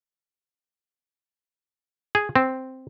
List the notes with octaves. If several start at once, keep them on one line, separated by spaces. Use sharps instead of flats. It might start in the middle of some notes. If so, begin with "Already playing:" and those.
G#4
C4